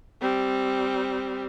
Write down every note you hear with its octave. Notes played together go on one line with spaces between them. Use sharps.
G3 C4